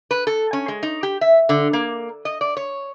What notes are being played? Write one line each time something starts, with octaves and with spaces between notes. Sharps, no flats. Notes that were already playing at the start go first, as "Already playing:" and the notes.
B4
A4
C#4
G#3
D#4
G4
E5
D3
A#3
D#5
D5
C#5